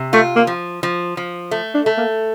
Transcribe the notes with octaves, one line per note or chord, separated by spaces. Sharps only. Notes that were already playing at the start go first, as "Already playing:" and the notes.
Already playing: C3
A3 F4
A#3
F3
F3
F3
A3
D4
A3
A#3